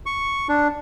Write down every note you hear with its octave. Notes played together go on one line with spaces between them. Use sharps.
C#6
D4